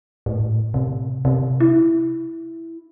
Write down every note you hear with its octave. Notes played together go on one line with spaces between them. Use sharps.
A2
C3
C3
E4